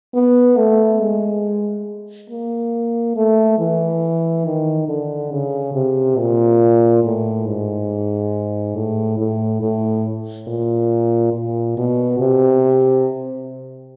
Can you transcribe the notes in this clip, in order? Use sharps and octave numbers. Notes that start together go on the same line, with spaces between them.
B3
A3
G#3
A#3
A3
E3
D#3
D3
C#3
C3
A#2
A2
G#2
A2
A2
A2
A#2
A#2
B2
C3